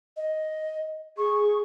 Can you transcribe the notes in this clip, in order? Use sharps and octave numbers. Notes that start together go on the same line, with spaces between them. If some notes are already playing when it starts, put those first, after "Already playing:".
D#5
G#4 C#6